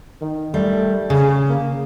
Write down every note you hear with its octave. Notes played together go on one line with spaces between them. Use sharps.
D#3
G3 A3
C#3 G#4
A#3